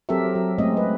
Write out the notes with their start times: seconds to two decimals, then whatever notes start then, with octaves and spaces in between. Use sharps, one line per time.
0.09 F#3 C4 G4 A4 A#4 E5
0.35 F#3
0.58 G#3 A3 C4 C#4 D#5
0.77 B4